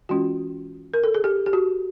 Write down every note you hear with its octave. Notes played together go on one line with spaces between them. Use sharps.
E3 G#3 C#4 F4 F#4
A#4
A4
G#4
G4
G4
F#4